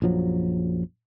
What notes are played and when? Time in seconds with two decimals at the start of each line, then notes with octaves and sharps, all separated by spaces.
0.02 A#1 F#2 F3 F#3